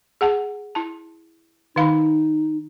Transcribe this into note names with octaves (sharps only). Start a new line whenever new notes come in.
G#4 F#5 A5
E4 A5
D#3 D#4 F5 B5